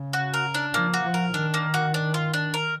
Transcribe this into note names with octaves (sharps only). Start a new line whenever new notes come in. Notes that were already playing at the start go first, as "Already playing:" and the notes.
Already playing: C#3
F#4
A#4
D4
F3 A#3
F#4
F3
A#4
D#3 D4
A#3
F#4
D4
F4
D4
A#4